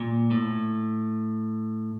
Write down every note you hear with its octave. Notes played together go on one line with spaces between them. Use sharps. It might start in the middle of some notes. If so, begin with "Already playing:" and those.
Already playing: A#2
A2